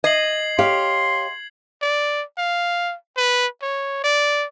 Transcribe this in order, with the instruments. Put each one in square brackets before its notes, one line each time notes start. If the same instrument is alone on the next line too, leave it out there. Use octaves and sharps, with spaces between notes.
[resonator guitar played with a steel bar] D#5 [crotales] G#6 C7 F#7
[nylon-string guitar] G4 C#5 F5 [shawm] C6
[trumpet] D5
F5
B4
C#5
D5